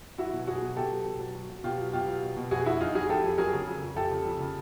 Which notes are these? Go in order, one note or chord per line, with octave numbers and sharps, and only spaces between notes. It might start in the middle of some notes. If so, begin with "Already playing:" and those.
F#3 E4 F#4
B2
F#3 F#4 G#4
B2
B2 G4 A4
F#3
B2
F#3
F#3
F#3
B2 F4 G4
F#3
B2 F4 G4
F#3
B2
B2
F2 F#4 G#4
F2 E4 F#4
F#3 D#4 F4
F2 F#4 G#4
F2 G4 A4
F2
F#3 G#4 A#4
C#3
F2
F2
F2 G4 A4
C#3
F2
C#3